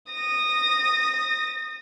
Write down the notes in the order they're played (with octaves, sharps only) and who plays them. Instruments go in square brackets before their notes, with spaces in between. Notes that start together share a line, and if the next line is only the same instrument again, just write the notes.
[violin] D#6 A#6